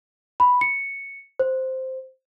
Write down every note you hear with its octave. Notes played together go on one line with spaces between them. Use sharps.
B5
C#7
C5